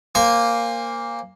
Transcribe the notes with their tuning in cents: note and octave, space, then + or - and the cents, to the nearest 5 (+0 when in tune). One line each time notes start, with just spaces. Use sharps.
A#3 +0 C5 +10 G#5 -30